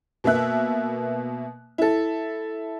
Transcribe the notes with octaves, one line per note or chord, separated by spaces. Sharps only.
B2 A#3 B3 E5 F#6
E4 A4